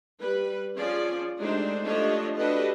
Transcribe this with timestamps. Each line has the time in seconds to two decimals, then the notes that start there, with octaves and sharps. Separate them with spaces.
0.19 G3 B4
0.77 F3 C#4 G#4 D5
1.38 G#3 A3 D4 D#4 G4 C5
1.84 F3 A3 D4 G4 C#5 D#5
2.36 D4 F#4 G4 A4 B4 D#5